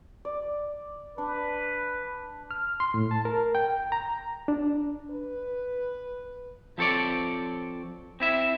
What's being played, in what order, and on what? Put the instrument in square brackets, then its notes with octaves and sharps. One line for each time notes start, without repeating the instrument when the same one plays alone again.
[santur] D5
[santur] D4 [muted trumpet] B4
[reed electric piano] F6
C6
A2
A5
A#4
G5
A#5
D4
[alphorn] B4
[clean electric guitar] F3 C4 A4 C#5 D5
C4 E4 E5